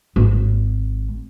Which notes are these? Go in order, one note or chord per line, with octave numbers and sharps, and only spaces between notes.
G#1